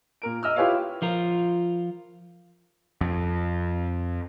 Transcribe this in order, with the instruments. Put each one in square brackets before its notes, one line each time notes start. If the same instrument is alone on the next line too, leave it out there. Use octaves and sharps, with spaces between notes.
[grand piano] A#2 A#4 D7
D#5 E6 F6
E4 F4 G4 B4 C#5 F5
[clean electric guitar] F3 F4 A#4
[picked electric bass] F2